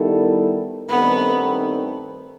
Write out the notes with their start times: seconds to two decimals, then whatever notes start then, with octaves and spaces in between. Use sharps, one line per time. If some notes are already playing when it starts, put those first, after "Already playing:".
Already playing: D#3 G3 B3 E4 A4
0.89 G2 D#3 A3 B3 C4 D#4